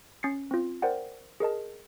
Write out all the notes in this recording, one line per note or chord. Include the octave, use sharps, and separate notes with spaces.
C#4 A6 C7 C#7
C4 F4
A#4 C5 D5 F#5 G5
G#4 A#4 D#5 A5